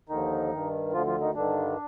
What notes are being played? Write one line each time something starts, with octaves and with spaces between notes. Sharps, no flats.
D#2 D3 D#3 F3 D#4
G2 D#3
D2 D3 F3 F4
F3 F4
D#3 D#4
G2 D3 D#3 D4